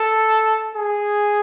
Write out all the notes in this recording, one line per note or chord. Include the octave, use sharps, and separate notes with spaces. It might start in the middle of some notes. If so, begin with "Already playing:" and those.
Already playing: A4
G#4